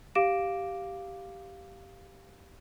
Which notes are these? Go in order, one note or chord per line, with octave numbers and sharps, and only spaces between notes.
G4 F5 D6 A#6 D7 E7